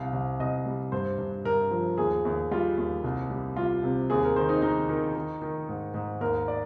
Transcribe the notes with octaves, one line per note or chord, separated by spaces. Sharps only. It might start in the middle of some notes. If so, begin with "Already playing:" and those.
Already playing: C2 F5
C2
C2 D#5
G3
G2 C5
G2
G2 A#4
F3
D#2 G#4
D#2
G3 F4
D#2
C2
G3
G3 F4
C3
D#2 G#4
A#4
D#3 C5
D#4
D#3 D#4
D#3
D#3
D#3
G#2
G#2
D#2 A#4
D5